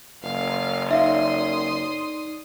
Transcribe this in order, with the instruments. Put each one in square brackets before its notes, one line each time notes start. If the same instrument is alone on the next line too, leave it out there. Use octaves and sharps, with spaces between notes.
[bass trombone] F#1 [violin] F5
[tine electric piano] D#4 D5 [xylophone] E5 F5 [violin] C6 D#6